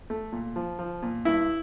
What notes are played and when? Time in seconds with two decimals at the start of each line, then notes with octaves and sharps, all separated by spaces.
0.10 A3
0.32 A#2
0.56 F3
0.79 F3
1.02 A#2
1.25 G2 E4